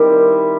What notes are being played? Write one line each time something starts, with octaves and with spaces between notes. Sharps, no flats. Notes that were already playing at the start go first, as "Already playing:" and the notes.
Already playing: D#3 G3 C4 E4